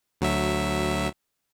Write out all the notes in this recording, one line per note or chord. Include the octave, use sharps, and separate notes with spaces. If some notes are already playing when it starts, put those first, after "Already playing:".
D2 F#3 E5